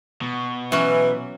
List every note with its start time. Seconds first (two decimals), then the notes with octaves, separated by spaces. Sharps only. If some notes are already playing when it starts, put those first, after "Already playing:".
0.22 B2
0.72 E3 F#3 C#4